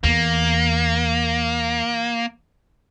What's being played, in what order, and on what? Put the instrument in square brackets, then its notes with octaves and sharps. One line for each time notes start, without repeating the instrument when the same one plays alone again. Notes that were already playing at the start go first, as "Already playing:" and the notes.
[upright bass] E2 [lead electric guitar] A#3